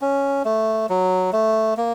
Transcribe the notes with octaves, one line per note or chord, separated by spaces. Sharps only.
C#4
A3
F#3
A3
A#3